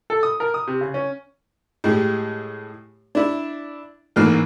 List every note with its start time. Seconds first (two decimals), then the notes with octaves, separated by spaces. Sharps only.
0.10 A4
0.23 D#6
0.40 A#4
0.54 D#6
0.67 C3
0.81 C#3
0.94 C#4
1.84 A2 G#3 G4
3.15 D4 E4
4.16 A1 G#2 E3 A#3 F6